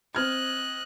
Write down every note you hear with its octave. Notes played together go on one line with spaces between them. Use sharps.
C4 D#5 F6 F#6 G#6